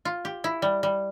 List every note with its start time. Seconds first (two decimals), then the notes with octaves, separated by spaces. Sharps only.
0.05 F4
0.25 G4
0.44 E4
0.62 G3
0.83 G3